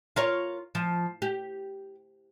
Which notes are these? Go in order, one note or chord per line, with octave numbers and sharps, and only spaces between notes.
F4 A#4 C#5
F3
G4